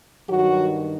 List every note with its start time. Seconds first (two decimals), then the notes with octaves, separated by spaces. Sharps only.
0.28 G2 D#3 F#3 F#4